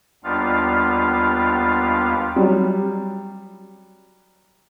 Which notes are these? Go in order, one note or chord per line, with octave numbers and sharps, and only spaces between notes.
D#2 G3 B3 D4 F4 F5
F#3 G3